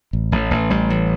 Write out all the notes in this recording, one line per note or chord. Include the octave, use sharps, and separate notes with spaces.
A1
A1
A1
A1 G3
A1